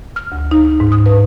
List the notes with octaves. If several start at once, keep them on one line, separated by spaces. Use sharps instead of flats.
F6
D2
D#4
G#2
D#6
B4